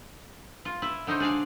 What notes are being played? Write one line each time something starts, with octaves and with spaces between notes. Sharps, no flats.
F4
E4
D3 D#4 C5 C#5
D4 G#4 D5 F5